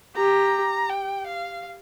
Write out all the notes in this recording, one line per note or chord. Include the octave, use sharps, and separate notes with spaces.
G4 A#5
G5
F5